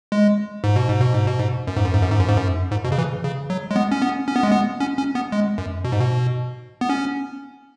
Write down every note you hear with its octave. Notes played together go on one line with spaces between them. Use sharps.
G#3
G#2
B2
G#2
B2
G#2
B2
G#2
F#2
G#2
F#2
G#2
F#2
G#2
F#2
G#2
F#2
G#2
B2
C#3
E3
C#3
F#3
G#3
B3
C#4
B3
C#4
B3
G#3
B3
C#4
C#4
B3
G#3
F#2
B2
G#2
B2
B3
C#4